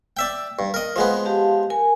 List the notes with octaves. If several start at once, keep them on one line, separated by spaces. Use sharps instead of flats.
D5 E5 G5
G2
A#4 D#5
F3 G#3 B3
G4 F5 A5
A#4 G#5